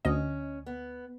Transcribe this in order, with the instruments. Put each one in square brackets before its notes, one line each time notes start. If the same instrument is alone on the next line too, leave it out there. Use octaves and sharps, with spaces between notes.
[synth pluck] D2 D#5 [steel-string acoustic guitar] C#4
[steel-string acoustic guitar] B3